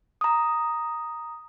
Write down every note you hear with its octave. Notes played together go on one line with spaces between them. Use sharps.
A#5 D#6